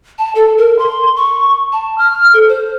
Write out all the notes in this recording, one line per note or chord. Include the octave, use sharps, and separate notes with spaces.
A5
A4
A#4
C6
C#6
A5
F6
A4
C5